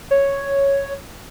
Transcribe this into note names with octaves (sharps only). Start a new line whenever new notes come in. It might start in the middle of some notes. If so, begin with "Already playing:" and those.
C#5